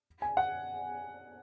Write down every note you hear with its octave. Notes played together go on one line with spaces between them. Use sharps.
G#5
F#5